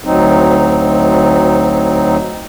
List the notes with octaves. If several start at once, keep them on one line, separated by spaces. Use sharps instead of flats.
D2 F#3 C4 D#4